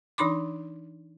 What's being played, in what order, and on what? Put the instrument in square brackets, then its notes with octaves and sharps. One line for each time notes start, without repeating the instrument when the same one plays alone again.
[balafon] E3 D4 D#4 B5 C6 D6